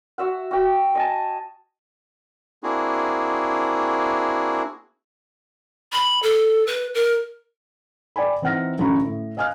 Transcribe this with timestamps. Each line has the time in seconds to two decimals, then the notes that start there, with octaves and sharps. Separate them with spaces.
0.18 F#4 E5 F#5
0.51 F#4 G5
0.95 D#5 G#5 A5
2.63 A#3 C4 D4 E4 F#4 G#4
5.93 B5
6.23 A4
6.67 B4
6.94 A#4
8.16 D5 G5 G#5 B5
8.42 E3 C4 D#4 F#5 F6 A#6
8.79 A1 F#2 D3 A#5 B5 C#6
9.04 A2
9.37 D#5 F5 G#5 D#6 F6 F#6